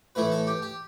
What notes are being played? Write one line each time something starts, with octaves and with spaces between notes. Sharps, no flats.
A2 E3 A3 E4 B4
A4
G4
G4